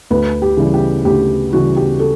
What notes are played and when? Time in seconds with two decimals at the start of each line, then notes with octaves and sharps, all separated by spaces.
0.11 D2 B4
0.42 G4
0.57 C#3 E3 G3
0.74 G4
1.05 D2 G4
1.52 C#3 E3 G3 F#4
1.77 G4
2.00 A4